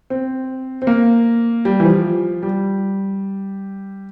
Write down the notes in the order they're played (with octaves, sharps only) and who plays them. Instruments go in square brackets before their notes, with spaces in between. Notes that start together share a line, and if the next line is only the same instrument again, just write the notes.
[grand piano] C4
C4
A#3
G3
E3
F3
G3